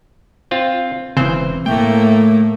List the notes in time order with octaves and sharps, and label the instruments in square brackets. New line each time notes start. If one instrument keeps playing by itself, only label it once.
[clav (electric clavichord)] C4 F4
[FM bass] E1 [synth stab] C#3 C4 [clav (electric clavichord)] E3 C5
[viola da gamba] A2 A#3 [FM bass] A3 [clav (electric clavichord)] G5